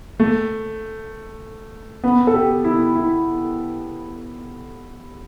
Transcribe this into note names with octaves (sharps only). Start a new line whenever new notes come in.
A3
B3
A4
G4
E4
E4